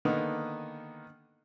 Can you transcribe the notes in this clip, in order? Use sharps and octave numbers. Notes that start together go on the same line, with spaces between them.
D3 D#3 A#3 B3 D#4